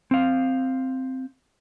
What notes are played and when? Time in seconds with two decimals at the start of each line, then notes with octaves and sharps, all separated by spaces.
0.11 C4 F5